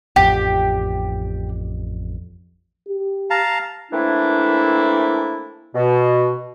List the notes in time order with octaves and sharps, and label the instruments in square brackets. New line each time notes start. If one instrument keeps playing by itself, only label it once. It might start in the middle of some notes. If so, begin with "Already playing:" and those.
[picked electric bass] A1 F2 [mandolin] G4
[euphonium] G4
[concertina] F5 A5 A#5
[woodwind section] E3 A3 A#3 C4 D4 E4
B2